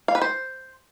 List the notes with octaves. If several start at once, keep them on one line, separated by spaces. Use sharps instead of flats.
F5
B4
C5